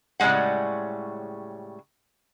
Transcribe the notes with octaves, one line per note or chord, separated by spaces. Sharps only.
A2 C#3 G3 G#3 F#5